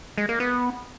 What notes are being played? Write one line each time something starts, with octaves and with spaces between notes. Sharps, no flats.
G#3
A#3
B3